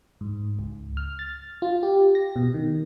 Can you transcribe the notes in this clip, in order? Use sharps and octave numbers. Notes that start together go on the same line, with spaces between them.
G#2
C#2
F6
A6
F4
G4
A#6
B2
D#3